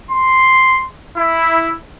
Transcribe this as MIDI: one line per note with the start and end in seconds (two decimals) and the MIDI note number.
0.11 0.85 84
1.18 1.72 64